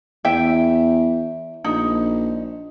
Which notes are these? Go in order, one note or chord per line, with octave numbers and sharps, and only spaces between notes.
E2 E5 G5
A#1 D#4